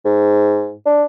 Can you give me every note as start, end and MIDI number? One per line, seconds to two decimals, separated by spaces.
0.05 0.74 44
0.86 1.04 62